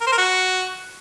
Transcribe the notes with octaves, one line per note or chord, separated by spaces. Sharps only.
A#4
C5
A#4
F#4